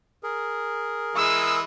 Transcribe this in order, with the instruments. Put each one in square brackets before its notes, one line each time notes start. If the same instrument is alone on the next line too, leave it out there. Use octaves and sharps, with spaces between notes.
[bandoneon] G#4 A#4
[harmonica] E3 G#3 [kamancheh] E6